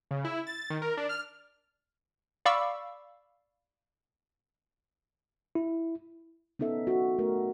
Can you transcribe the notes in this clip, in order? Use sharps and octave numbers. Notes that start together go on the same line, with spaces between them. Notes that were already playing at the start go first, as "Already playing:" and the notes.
C#3
E4
A6
D#3
A#4
D4
F6
D5 F5 B5 C#6 D6 E6
E4
B3 C#4 D#4 A4 E5
F#4
A3 A#4